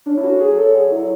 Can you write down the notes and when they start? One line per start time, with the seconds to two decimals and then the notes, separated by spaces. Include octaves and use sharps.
0.06 C#4 D4
0.18 E4
0.23 A3 F#4
0.41 F#3 G#4
0.57 C#3 A4
0.70 D3 G#4
0.84 E3
0.92 F#3 E4